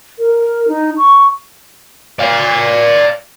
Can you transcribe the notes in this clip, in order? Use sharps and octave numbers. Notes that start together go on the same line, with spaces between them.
A#4
D#4
C#6
D5 F5